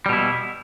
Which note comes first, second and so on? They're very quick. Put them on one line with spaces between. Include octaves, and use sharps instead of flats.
G3 B2 E4